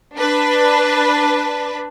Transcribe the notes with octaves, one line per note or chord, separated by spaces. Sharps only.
D4 B4